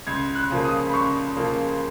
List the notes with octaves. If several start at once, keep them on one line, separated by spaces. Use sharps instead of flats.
C#2 G#6
F#6
C#3 F3 A#3
D#6
B5
C#2 C#6
C#3 F3 A#3